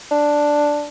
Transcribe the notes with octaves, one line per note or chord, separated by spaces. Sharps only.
D4